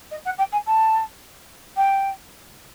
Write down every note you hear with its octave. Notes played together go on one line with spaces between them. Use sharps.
D#5
F#5
G5
G#5
A5
G5